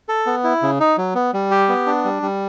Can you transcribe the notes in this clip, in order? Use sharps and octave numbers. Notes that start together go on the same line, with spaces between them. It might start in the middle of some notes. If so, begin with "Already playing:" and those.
A4
B3
E4
C#3
D#4
F#3
B3
G3
G4
B3
D4
G3
G3